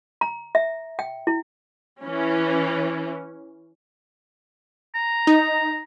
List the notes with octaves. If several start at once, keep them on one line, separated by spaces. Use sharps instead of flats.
A#5
E5
G5
E4
E3 C#4
A#5
D#4